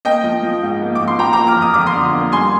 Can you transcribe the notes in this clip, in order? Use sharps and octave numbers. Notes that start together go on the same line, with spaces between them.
A#3 D#5 G5
F3
F3
G#2
A#3
F3 D6
C6
F3 G5 A#5
A#5 D6
A#3
D6 F6
F2
D#6
F2 D6
C6 D#6
D3
A#3
G3 G#5 C6